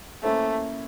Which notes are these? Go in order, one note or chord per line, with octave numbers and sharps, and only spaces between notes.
A3 A#3 C#4 E4 A4 C5